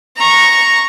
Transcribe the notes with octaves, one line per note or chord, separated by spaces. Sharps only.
A#5 C#6